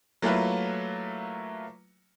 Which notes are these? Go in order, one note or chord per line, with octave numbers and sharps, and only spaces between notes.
F#3 A3 A#3 E4 F4 B4